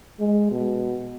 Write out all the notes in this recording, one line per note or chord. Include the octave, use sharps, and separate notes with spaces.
G#3
B2